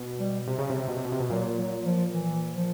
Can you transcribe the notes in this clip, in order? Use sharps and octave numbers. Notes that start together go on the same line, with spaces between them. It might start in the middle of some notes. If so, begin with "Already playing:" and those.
Already playing: B2
G3
C3
C#3
C3
B2
C3
B2
C3
B2
A#2 F#3
F#3
F3
E3
F3